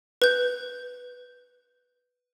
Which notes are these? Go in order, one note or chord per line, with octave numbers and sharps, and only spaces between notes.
B4 G6